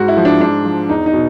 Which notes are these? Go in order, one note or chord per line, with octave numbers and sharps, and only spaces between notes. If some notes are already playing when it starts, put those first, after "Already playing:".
Already playing: G#2 F#4
E4
F3
D4
G#2 D4
F3
E2 D#4
D#4
B2